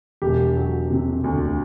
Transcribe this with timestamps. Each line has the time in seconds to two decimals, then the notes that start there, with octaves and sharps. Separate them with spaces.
0.22 E1 G4
0.57 F#3
0.90 C3
1.24 D2